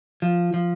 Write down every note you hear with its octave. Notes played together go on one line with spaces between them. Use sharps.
F3
F3